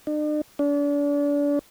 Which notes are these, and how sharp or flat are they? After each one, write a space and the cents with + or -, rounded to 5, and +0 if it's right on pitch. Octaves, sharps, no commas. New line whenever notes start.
D4 +45
D4 -35